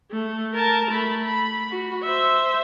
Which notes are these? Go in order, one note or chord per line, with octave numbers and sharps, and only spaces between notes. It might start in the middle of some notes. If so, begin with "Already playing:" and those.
A3
A#4 A5
A3 B5
B5
F#4
C5 E5